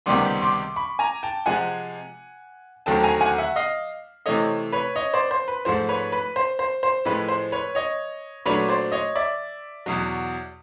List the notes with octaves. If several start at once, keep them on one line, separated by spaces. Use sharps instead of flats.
C#2 C3 D#3 G3 B3 C6 D6
C6 D6
B5 C#6
G#5 A#5
G5 A5
C3 F3 G#3 F#5 G#5
D#2 D3 F#3 A3 C4 G5 A5
G#5 A#5
F#5 G#5
E5 F#5
D#5 F5
C3 E3 A3 C#5 D#5
B4 C#5
C#5 D#5
C5 D5
C5
B4
G#2 F3 A3 C5
B4 C#5
B4
C5
C5
C5
A2 F3 G#3 B4
C5
B4 C#5
C#5 D#5
A#2 F#3 A3 D4 B4 C#5
C5 D5
C#5 D#5
D5 E5
E2 B2 F#3